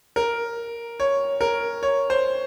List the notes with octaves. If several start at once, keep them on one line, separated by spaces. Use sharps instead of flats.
A#4
C#5
A#4
C#5
C5